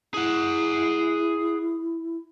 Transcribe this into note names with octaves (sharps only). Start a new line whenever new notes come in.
E4 G#4 F#5